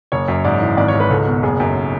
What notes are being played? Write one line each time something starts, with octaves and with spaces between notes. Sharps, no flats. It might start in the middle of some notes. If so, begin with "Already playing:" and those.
F#1 C#5
F#2
G#2 D5
E3
G#1 D5
C#5
G#2
B4
C#2 A4
B2
F#1 G#4
F#2